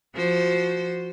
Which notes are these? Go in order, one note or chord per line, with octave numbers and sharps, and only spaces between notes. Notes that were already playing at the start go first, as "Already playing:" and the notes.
F3 F#4 C5